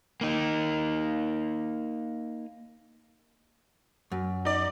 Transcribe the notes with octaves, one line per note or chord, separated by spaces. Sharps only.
A#3 D#4
F#2
D#4 D5